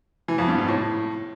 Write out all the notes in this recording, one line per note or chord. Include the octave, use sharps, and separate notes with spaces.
E3
F2
G2
G#2
A2